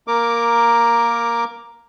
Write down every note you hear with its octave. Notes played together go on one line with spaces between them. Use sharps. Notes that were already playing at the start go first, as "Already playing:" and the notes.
A#3 A#4 D6